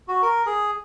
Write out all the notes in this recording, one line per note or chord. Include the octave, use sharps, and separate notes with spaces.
F#4
A#4
G#4